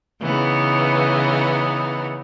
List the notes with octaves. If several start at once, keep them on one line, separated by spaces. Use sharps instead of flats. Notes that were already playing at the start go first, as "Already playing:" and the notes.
C#3 E3 B3 D#4